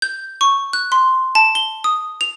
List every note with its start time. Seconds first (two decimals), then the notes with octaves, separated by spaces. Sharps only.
0.02 G6
0.41 C#6
0.73 F#6
0.92 C6
1.35 A5
1.55 G7
1.84 D#6
2.21 F7